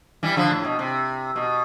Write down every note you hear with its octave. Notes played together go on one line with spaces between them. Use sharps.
E3 G3
D3 F3
A2
B2
C3
B2